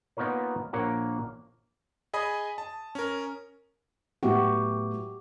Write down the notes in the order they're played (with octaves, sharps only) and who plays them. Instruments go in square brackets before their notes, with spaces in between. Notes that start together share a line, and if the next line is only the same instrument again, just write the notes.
[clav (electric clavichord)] A#3 B3 D#4 F4 A#4 C#5
A#1 A#3 A#4 C#5 F#5
[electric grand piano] G#4 D#5 G#5 B5 D#6
A5
C#4 A#4
[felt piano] A2 F#3 B3 [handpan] F#4 G4